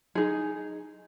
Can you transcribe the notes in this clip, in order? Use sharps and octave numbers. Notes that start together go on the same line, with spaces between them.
D#4 G#4